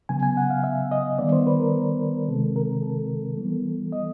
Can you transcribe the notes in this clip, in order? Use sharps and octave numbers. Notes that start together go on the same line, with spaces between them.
C#3 F#3 B3 G#5
G#5
F#5
F5
E5
D#5
D#3 G3 B3 D5
C5
B4
A#4
C3 D#3 G#3 C4 A4
A#4
A4
E3 G3 B3
D#5